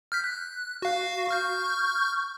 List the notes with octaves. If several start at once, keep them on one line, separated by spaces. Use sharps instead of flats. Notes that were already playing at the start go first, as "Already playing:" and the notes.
F6 G6 B6
F#6
F#4 F5
C#6 F6 G6